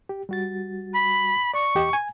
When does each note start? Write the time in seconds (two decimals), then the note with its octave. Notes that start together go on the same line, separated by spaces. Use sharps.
0.09 G4
0.29 G3 F#4 A6
0.93 B5
1.54 D5 C#6
1.75 E2 G4 D#5
1.93 G#5